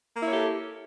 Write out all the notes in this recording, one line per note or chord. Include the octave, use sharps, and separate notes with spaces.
A#3 E4 G4 A4 C#5